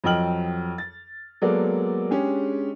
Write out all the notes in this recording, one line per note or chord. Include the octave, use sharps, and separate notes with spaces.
F2 F#3 D#5 G5 F6 F#7
A6
F#3 G#3 A#3 B3 A4 D5
G#3 C#4 D4 G4 G#4